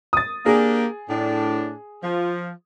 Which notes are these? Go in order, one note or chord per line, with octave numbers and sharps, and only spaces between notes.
D#6 A6
A#3 D4 G4 G#4
A2 D4
F3